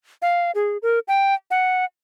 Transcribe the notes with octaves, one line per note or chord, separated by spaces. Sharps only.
F5
G#4
A#4
G5
F#5